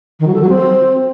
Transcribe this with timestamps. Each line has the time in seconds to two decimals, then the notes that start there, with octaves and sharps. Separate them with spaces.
0.20 D#3
0.27 F#3
0.34 A4
0.41 F#3
0.49 C4